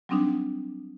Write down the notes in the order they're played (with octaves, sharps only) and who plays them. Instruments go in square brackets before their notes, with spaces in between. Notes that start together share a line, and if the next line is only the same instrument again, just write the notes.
[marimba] F#3 G3 C4 D4 D#4